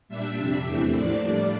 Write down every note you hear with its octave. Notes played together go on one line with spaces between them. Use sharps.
A#2 G3 D4 E5
F2 C3 G3 D4
E2 E3 A3 C4
A2 F3 A#3 D4 D5
A2 G3 D4